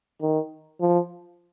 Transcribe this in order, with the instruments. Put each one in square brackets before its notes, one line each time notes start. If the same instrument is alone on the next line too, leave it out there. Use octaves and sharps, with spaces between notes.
[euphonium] D#3
F3